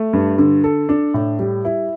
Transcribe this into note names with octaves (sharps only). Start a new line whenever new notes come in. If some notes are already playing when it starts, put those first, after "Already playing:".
Already playing: A3
G2
D3
A4
D4
A2
G3
E4